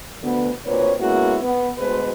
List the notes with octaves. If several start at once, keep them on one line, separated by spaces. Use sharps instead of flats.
D2 B3
D2 A#2 C4 B4 C#5
G#3 A#3 B3 C#4 E4 F#4
B3
D2 B2 G#3 B4 C5